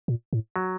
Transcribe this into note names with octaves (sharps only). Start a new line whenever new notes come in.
A#2
A2
F#3